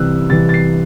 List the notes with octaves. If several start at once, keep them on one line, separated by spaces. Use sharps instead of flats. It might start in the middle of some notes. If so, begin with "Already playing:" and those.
Already playing: C2 C3 E3 E6 F#6
C2 C3 E3 A6
A6
C7